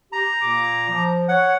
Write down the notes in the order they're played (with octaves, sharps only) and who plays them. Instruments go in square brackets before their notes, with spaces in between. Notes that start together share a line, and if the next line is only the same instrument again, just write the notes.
[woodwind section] G4 [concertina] A#5
[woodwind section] A#2 A#3 D6
F3
[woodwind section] C#5 [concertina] F#5